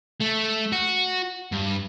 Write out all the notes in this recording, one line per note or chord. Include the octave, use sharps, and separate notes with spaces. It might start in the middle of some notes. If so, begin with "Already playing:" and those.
A3
F#4
G2